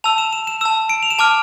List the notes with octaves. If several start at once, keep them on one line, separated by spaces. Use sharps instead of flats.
A5 E6 F7
E7
E7
E7
A5 E6 E7
D7
F7
E7
A5 D6 F6 D7